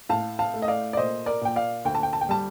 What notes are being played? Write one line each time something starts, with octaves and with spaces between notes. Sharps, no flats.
A2 F5 A5
F5 A5
A3
D#5
D5 F5
D5
A#2 C5 D#5
A#4 D5
A#2 G5
D5 F5
D2 G5
A5
G5
A5
G5
G3 A5